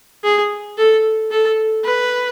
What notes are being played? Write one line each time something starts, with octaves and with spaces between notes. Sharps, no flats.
G#4
A4
A4
B4